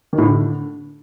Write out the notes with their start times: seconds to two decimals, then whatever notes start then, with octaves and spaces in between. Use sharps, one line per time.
0.13 D#3
0.18 A2
0.24 D3